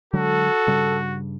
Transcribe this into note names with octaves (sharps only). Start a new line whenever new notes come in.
D3 F#3 G#3 F#4 A4
G2 C#3 G3